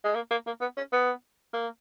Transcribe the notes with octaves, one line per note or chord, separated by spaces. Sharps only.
G#3
A#3
A#3
A#3
B3
C#4
B3
A#3